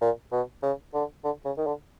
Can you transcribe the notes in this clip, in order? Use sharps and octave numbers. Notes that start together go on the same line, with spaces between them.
A#2
B2
C#3
D3
D3
C#3
D#3
D3